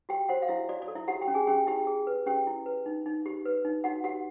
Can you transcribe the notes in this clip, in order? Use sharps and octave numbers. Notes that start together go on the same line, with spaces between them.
F#4 G4 G5
F#4 C5 F#5
F5
E4 F#4 E5
F#4 D5
D5
A4
E4 E5
F#4 G4 F#5
G4 G5
C#4
G#4 G#5
C#4 G4 G5
E4 G4 G5
G#4
B4
C#4 G4 G5
E4
B4
D#4
D#4
G4
B4
D#4
D#4 F#4 F#5
F#4 G4 F#5